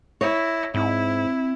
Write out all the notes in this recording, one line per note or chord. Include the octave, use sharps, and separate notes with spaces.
E4 C#5 A#6
G#2 C4 E4